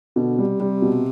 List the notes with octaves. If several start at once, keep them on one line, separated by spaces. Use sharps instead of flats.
B2 D3
C3 G3
G3
B2